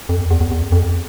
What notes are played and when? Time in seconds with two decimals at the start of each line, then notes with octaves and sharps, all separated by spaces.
0.09 F2
0.20 E2
0.31 E2
0.41 E2
0.51 E2
0.62 F2
0.72 F2